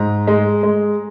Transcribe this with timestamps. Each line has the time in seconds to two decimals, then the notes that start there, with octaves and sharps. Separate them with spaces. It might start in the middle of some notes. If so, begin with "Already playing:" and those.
Already playing: G#2 A#5
0.27 G#3
0.63 G#3